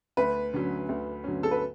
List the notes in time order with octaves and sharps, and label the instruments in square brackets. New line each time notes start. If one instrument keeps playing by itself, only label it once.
[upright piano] D2 B4
D3 F#3 C#4
D2
D3 F#3 C#4
A4
B4